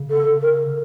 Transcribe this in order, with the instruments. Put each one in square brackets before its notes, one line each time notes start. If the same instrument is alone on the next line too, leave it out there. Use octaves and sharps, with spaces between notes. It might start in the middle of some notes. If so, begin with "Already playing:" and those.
Already playing: [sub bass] C#3
[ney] A4
A#4